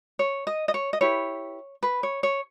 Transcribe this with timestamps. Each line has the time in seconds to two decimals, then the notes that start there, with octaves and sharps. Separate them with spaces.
0.19 C#5
0.47 D#5
0.68 D#5
0.74 C#5
0.93 D#5
1.01 E4 G4 B4 C#5
1.83 B4
2.03 C#5
2.23 C#5